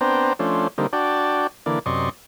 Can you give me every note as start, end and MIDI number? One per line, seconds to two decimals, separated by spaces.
0.01 0.33 59
0.01 0.33 60
0.01 0.33 62
0.01 0.33 72
0.01 0.33 79
0.01 0.33 82
0.39 0.68 53
0.39 0.68 57
0.39 0.68 61
0.39 0.68 62
0.39 0.68 72
0.78 0.87 50
0.78 0.87 55
0.78 0.87 58
0.78 0.87 60
0.78 0.87 63
0.93 1.47 62
0.93 1.47 66
0.93 1.47 74
0.93 1.47 79
0.93 1.47 81
1.66 1.79 50
1.66 1.79 52
1.66 1.79 58
1.66 1.79 74
1.86 2.10 42
1.86 2.10 48
1.86 2.10 74
1.86 2.10 75
1.86 2.10 84
1.86 2.10 85